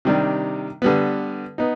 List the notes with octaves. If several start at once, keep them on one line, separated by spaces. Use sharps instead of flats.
C3 D#3 G3 D4
D3 G3 B3
B3 D#4